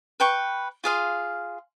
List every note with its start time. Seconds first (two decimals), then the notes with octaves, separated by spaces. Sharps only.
0.20 B4 G5 C#6
0.84 F4 G#4 F5 C6